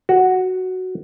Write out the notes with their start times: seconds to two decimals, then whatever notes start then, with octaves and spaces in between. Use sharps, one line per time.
0.09 F#4